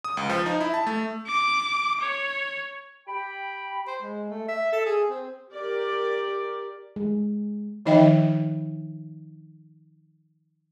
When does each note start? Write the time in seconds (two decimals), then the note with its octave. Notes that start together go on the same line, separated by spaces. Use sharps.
0.04 D#6
0.17 C#2
0.30 F3
0.46 D#4
0.60 E4
0.74 A5
0.87 A3
1.27 D6
2.01 C#5
3.08 G4 G5 B5
3.87 C5
4.02 G#3
4.30 A3
4.48 E5
4.72 A4
4.86 G#4
5.10 C4
5.54 G4 A#4 D5
6.96 G#3
7.86 D#3 F3 D#4 D#5 E5 G5